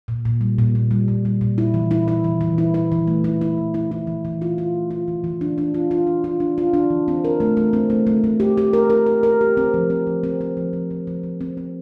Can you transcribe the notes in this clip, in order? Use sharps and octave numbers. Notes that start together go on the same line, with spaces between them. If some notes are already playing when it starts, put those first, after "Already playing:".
A#2
A#2
G3
A#2
A#2
G3
A#2
G3
A#2
E4
E3
E4
E4
E3
E3
E4
E4
E3
A3
E4
E4
E3
E4
E4
E3
E3
F4
F4
A3
F4
E3
E3
D4
D4
F4
F4
D4
F4
D4
F4
D4
E3
C4
A#4
A3
A3
C4
A3
A3
A3
G4
G4
A#4
A#4
A#4
A#4
G4
C4
F3
C4
F3
C4
C4
F3
F3
F3
F3
F3
C4
C4